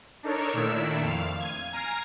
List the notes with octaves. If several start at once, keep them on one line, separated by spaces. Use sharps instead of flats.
D4 D#4 A4 A#4 C#5
A#2 D#3 A3 D4 E4 E6
F2 F5
G#6 D#7
G#5 A#5 F6 C7 D7